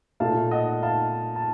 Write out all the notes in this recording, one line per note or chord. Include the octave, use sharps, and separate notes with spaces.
A#2 A3 F5 A5
D#5 F#5
F5 A5
A5